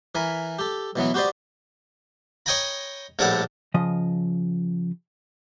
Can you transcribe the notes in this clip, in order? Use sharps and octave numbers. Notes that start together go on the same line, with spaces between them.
E3 A#4 G#5 B5
G4 A4
B2 E3 F#3 B3
F#4 G4 B4 C5 D5 D#5
C#5 D#5 G5 G#5 A#5 B5
A#1 A2 G3 D4 F#5 D6
C#3 F3 D#5